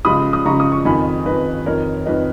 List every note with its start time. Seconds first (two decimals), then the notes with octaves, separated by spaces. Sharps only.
0.05 C#2 C#3 F3 B5 D#6
0.33 D#6
0.45 C#2 C#3 F3 A#5 C#6
0.60 D#6
0.72 C#6
0.85 F2 D#3 G#5 B5
1.25 F2 D#3 B4 D#5
1.66 F2 D#3 A#4 C#5
2.06 F2 D#3 B4 D#5